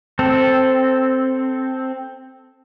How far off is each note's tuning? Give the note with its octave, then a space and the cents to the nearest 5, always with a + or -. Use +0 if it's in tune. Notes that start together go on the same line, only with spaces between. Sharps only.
C4 +0 A4 +0